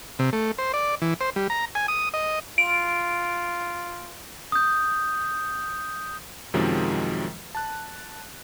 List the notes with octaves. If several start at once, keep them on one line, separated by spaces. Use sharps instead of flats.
C3
A3
C5
D5
E3
C5
G3
A#5
G#5
D#6
D#5
F4 D7
D#6 G6
F#2 C3 D#3 F3 F#3 G#3
A5 F#6